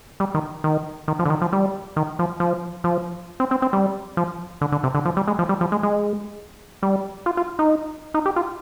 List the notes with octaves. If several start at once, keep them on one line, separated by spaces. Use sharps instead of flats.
G3
D#3
D#3
D#3
F3
D3
D#3
F3
G3
D#3
F3
F3
F3
C4
C4
C4
G3
F3
D3
D3
C3
D3
F3
G3
G#3
F3
G3
F3
G#3
G#3
G3
F4
F4
D#4
D#4
G4
F4